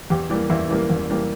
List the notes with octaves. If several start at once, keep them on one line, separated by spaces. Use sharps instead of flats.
E2 G4
E3 G3 A#3
E2 E4
E3 G3 A#3
E2
E3 G3 A#3